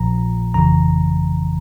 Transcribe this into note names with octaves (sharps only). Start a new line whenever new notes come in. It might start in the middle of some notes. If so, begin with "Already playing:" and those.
Already playing: A#1 A#2 F3 A#5
G1 F2 C#3 E3 A#5